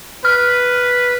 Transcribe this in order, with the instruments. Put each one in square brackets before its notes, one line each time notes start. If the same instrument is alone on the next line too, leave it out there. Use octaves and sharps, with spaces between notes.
[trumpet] B4 [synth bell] F6